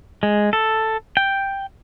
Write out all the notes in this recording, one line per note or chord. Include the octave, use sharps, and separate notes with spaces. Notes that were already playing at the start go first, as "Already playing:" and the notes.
G#3
A4
G5